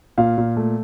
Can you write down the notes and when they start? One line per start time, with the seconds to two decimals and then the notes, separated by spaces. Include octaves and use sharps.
0.18 A#2 F5
0.38 A#2
0.57 A3